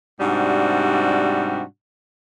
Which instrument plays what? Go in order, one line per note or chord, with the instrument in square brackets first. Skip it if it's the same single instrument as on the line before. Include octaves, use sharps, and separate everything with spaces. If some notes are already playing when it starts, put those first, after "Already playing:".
[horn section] G#2 C3 G3 D4 F#4